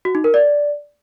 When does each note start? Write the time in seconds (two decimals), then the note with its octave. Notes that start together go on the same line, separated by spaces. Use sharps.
0.05 F#4
0.15 D#4
0.24 A#4
0.34 D5